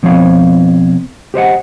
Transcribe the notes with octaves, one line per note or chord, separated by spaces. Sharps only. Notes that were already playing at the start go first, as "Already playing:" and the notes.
B2 F3 C4 C#5 F5
G4 C5 D#5 F#5